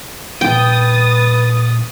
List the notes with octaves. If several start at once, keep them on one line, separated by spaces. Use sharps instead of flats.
A#2 F3 G3 B4 G5 D#6 A6